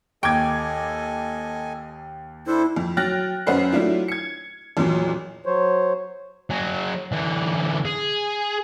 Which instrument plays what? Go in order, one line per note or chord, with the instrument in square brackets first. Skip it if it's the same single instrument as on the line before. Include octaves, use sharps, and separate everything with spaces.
[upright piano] D#2 D6 G#6 [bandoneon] A4 D#5 G#5 [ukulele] G5
[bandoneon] D4 A4 C5 [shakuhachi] E4
[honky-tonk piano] F2
F#3 G5 F6 F#6 A6 A#6
F#2 C#4 B4 C5 F#5 C7
F#3 A3 D4 E4 F4
G#6 C#7
A1 E2 A#2 F3 F#3
[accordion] F#3 C5 C#5
[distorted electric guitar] F#3 G#4
D3 E3
G#4